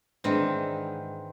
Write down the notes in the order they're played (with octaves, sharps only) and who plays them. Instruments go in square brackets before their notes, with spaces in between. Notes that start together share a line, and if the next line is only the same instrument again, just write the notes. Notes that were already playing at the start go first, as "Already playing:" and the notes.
[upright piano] G#2 D4 [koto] D#3 E3 C4